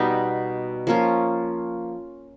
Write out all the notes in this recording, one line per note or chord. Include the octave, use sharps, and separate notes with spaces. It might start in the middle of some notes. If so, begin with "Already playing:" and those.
Already playing: B2 G3 B3 D#4
F3 A#3 C#4 F4